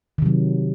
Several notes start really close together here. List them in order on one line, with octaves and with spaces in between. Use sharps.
D#3 C3 F#3